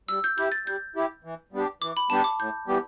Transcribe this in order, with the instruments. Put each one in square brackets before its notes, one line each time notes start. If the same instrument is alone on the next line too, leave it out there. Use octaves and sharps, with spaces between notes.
[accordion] G3 [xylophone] E6
[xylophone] G6
[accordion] E4 G4 [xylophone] G6
[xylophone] A6
[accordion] G3 [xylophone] G6
[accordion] E4 G4
E3
G3 B3 D4 G4
[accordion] E3 [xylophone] D6
[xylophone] B5
[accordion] G3 B3 D4 G4 [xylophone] A5
[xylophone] D6
[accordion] A2 [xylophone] G6
[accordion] E3 G3 B3 G4